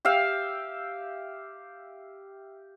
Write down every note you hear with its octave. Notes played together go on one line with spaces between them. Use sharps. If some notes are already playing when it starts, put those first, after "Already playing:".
G4 E5 F5 G5